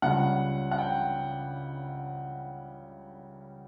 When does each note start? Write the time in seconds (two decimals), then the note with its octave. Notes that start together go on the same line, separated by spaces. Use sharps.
0.02 C#2 C#3 G3 F#5
0.71 F#5
0.78 G5